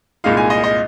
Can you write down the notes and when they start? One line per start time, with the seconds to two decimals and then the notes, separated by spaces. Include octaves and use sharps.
0.24 C2 A#2 G#3 D#4 F5
0.37 G#5
0.50 D#5
0.64 D#5